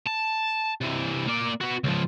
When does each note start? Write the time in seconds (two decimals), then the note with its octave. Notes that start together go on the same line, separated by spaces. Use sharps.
0.07 A5
0.81 C3 E3
1.27 A#3 D5
1.61 B3 F#4
1.84 C#2 F3